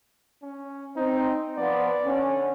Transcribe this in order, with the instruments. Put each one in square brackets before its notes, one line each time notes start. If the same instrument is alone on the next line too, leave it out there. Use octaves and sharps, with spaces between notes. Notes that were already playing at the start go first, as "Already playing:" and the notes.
[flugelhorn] C#4
[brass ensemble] C4 [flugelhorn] D#4
[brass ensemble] F3 B3 [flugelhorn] D5
[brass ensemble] D3 C#4